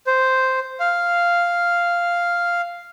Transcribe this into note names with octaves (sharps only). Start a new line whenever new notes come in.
C5
F5